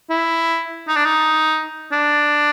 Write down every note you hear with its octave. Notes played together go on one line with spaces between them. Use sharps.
E4
D#4
D4
D#4
D4